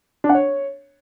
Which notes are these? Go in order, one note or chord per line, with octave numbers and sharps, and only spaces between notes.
D4
F#5
C#5